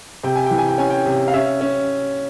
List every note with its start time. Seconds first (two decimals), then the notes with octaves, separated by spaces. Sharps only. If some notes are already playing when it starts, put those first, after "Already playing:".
0.24 C3 G5
0.35 G#5
0.46 E3 G5
0.58 G#5
0.68 G5
0.78 C#4 G#5
0.90 G5
1.06 C3
1.28 F5
1.34 C#4 E5
1.61 C#4